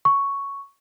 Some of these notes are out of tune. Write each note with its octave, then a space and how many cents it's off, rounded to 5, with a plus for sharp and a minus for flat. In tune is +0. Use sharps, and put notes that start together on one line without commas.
C#6 +5